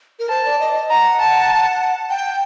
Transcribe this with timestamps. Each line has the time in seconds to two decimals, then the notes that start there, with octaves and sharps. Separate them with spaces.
0.19 A#4
0.29 C5 A5
0.45 D5
0.60 D#5
0.74 D#5
0.90 F#5 A#5
1.20 A5
2.10 G5